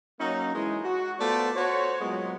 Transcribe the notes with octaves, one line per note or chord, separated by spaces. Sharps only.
F#3 A#3 C#4 D#4
E3 G#3
F#4
A3 B3 F4 C5 D5
F#4 C5 C#5
A#2 F#3 G#3 B3